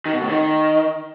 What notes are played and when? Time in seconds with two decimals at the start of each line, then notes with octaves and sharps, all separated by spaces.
0.06 D#3
0.13 B2
0.21 A2
0.29 D#3